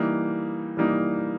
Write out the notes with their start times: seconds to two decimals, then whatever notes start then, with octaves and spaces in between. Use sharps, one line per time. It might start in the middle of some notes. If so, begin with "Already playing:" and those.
Already playing: E3 G3 A#3 D#4
0.77 E3 G3 A#3 D#4